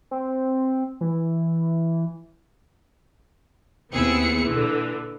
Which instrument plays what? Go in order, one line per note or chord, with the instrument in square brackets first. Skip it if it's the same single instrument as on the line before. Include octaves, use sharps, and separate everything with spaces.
[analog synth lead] C4
E3
[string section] D#2 B3 C4 E4 G#4 C#7
A#2 D3 E3